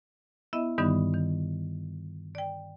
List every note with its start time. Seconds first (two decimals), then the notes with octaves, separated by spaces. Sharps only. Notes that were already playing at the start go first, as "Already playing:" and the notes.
0.53 B3 E4 D#5 E5
0.78 G2 D3 D#3 G3 B3 D#4
1.14 D#3
2.35 D5 G5